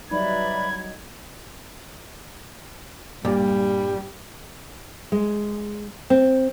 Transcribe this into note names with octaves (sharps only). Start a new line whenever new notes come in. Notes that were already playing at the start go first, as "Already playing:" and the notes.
F#3 G3 D#4 B4 D5 E5 B5 G#6
G2 A#2 G3
G#3
C4